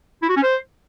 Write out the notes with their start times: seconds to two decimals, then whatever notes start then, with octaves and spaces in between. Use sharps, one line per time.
0.22 E4
0.29 F#4
0.36 C#4
0.43 C5